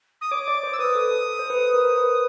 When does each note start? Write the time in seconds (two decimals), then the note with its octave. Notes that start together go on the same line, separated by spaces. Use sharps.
0.21 D#6
0.31 C#5 D6
0.48 D5
0.63 C5
0.73 E6
0.79 B4 D#6
0.95 A4
1.11 A4
1.39 C5
1.50 B4
1.74 A#4
1.90 C5
1.98 B4